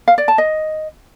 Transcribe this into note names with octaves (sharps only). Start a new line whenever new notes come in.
F5
D5
A5
D#5